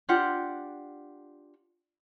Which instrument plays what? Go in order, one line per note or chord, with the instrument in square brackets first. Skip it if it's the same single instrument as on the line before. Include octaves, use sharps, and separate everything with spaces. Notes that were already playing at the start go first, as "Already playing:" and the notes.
[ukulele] D4 F4 G4 F#5